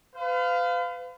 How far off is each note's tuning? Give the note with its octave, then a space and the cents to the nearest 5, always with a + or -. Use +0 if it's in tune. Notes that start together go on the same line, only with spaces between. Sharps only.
B4 +45 F5 +0